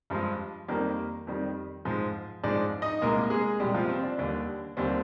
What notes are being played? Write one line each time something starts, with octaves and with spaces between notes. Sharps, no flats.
G2 F3 G#3
F2 D#3 G3 A#3 A#4
F2 D#3 G3
G#2 F3 G#3
G#2 F3 G#3 D4 D5
D#4 D#5
C2 A#2 G#3 A#3 A#4
G#3 G#4
C2 A#2 G3 G#3 G4
F3 F4
C4
D4
D#2 D3 G3
D#2 D3 G3 C4